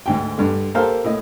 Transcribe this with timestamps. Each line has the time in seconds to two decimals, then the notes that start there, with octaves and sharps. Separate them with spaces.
0.06 D2 G#2 G5
0.38 G2 D3
0.75 A#3 G4 A4 A#4 C5 F5
1.04 A2 D#5